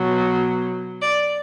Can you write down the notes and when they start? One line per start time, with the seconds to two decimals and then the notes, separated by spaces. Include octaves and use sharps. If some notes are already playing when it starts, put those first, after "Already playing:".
Already playing: B2 F#3
1.01 D5